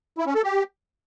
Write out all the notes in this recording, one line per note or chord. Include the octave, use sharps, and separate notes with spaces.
E4
C#4
A4
G4